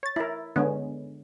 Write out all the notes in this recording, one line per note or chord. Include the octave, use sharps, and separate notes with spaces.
C#5 A6
E4 A#4
D3 G#3 B3 C#4